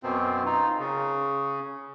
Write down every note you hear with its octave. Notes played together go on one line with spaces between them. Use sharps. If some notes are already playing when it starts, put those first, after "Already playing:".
F#2 B2 C4
D#4 F4
C#3